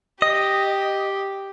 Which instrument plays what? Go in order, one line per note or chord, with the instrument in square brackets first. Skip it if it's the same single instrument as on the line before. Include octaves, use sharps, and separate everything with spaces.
[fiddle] G4 [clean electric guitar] D#5